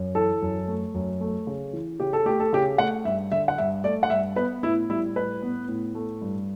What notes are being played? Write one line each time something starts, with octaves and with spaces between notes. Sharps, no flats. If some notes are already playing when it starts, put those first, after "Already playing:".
Already playing: F#2
E3 A4
F#2
A3
F#2
A3
C#3
E3
C#3 G4
A4
A3 G4
A4
C#3 G4
A3 F#5
G2 E5
D3 E5
F#5
G2 E5
A3 D5
F#5
G2 E5
B3 B4
A2 E4
G3 E4
A2 B4
B3
A2
A3
G2